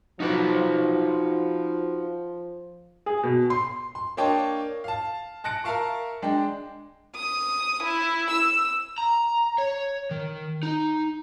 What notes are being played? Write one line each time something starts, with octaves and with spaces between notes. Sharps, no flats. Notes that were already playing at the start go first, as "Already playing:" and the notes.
F3 D#4 F#4 B4
G#4
B2
C6
C6
A#3 D4 C#5 D#5 G5 A5
F5 A5
A5 F#6 A#6 C#7 D7
A#4 E5 F5 A5 C#6
G#3 D4 G5
D#6
E4
E6
A#5
C#5
D#3
D#4